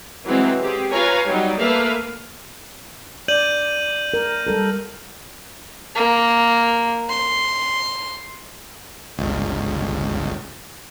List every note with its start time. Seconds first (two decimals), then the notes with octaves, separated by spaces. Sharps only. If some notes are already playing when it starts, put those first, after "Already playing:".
0.25 E3 F#3 G#3 C4
0.62 C4 G4 G#4
0.91 F4 B4 C#5 F5 G#5 A#5
1.28 F#3 G3 D#4
1.60 A3 A#3 B4 E5 F5
3.28 D5 G6 D#7 F#7
4.14 A#4
4.46 G3 A4 A#4
5.95 A#3
7.10 C6
9.18 G1 C#2